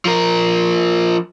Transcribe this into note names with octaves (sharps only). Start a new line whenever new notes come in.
F3 A#4